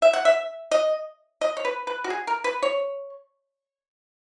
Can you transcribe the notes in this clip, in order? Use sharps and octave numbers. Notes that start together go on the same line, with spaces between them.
E5
F#5
E5
D#5
D#5
C#5
B4
B4
F#4
G#4
A#4
B4
C#5